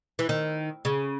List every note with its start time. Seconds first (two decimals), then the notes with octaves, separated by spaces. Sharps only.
0.19 E3
0.29 D#3
0.85 C#3